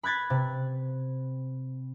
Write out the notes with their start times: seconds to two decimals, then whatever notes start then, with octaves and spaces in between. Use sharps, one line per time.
0.03 B5 F#6 G#6 A6 B6
0.30 C3